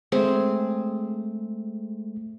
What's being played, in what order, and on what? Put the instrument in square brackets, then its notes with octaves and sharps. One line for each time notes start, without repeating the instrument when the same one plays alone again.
[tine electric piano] G#3 A3 [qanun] C4 G#4